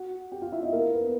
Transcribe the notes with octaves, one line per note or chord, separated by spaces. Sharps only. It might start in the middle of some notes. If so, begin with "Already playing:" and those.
Already playing: F#4 F#5
G4 G5
F4 F5
E4 E5
D#4 D#5
A#3 A#4
B3 B4